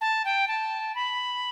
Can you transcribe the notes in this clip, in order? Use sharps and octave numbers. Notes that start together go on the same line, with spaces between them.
A5
G5
A5
B5